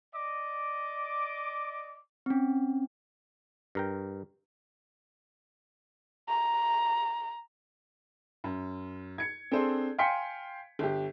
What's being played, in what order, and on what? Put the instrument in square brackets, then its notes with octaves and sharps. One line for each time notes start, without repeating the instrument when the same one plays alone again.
[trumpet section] D5 D#5 D6
[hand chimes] C4 C#4
[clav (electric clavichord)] G2 A#4 G5
[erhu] A#5
[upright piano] F#2
G#6 C#7
C4 D4 G#4 A4 C5
F5 G5 G#5 C6 B6 C#7
G1 G4